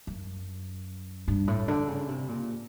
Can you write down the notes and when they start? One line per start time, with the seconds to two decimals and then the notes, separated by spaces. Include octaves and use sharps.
0.07 F#2
1.28 G2
1.48 A2
1.68 D3
1.88 C#3
2.08 C3
2.28 A#2